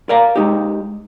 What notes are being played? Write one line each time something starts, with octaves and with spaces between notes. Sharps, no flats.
A#4 D5 F5 A#5
G#3 D#4 G4